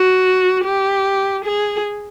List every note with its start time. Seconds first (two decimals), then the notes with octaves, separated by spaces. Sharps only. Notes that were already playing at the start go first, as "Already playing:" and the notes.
Already playing: F#4
0.65 G4
1.44 G#4